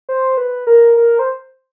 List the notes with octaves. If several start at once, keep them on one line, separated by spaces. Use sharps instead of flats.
C5
B4
A#4
A#4
C5